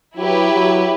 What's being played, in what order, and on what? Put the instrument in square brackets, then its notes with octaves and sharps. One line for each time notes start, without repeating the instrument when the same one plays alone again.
[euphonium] F#3 [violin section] E4 G4 B4
[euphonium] F#3